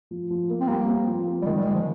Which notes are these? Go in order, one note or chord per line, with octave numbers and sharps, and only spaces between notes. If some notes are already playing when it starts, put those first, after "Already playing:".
F3
F3
A#3
C4
G3 A#3
C4
F3
C4
G3
D#3 G#3
G3
D#3 G#3
F3